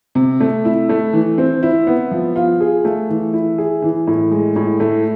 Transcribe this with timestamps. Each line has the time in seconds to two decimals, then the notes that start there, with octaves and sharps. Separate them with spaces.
0.15 C3
0.40 A3
0.65 E4
0.89 A3
1.13 E3
1.38 C4
1.63 E4
1.87 B3
2.11 F3
2.36 F4
2.61 G#4
2.85 A3
3.09 E3
3.33 E4
3.58 G#4
3.82 E3
4.07 A2
4.31 G#3
4.56 A2
4.80 A3